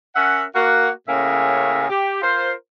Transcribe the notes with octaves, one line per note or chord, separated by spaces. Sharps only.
C#4 A#4 E5 F#5
A#3 F#4
A2 C#3 A#3 C#4 E5
G4
F4 A#4 C5